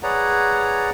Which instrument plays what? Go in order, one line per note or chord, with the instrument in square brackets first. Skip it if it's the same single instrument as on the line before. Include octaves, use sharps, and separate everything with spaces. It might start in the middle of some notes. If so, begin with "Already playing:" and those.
[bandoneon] G#4 B4 C#5 D5 F#5 A#5